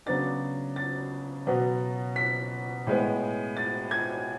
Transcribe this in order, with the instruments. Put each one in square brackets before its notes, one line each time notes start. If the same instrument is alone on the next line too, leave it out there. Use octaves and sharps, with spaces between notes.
[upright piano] C#3 F#3 B3 D4 A6
A6
B2 F#3 B3
B6
A2 G#3 B3
A6
G#6